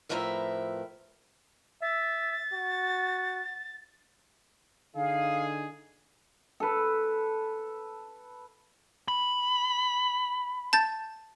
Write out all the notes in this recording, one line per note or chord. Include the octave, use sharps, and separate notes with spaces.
F2 A2 F3 A#4 B4 E5
E5 A6
F#4
D3 D#4 G#4 F5
A4 B4
B5
A5 G6 A6